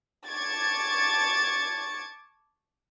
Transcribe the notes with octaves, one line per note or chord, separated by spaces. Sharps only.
A5 C#6 D6 G#6 A6